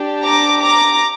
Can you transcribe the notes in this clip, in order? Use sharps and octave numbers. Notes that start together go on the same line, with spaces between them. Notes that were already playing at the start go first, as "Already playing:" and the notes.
Already playing: D4 G4
A#5 D6
A#5 D6